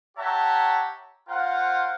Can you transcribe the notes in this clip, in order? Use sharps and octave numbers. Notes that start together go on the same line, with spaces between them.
G4 C#5 E5 F#5 A5 A#5
F4 A#4 C5 F5 F#5